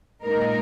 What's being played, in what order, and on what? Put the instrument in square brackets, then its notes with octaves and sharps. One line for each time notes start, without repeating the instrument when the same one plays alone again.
[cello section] A#2 G#3 D#4 A#4